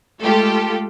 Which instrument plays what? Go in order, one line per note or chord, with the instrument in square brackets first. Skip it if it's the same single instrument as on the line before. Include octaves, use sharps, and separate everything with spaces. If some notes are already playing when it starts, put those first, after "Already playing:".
[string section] G#3 A3 F4 G4 A4